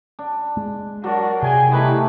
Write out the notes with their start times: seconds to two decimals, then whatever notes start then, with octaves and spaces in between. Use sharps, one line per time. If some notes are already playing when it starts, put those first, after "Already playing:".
0.19 D4
0.57 G#3
1.04 F#3 D4 F#4 A#4
1.42 C3 G#4 G5 G#5
1.71 E3 G3 A3 D#4 E4 B4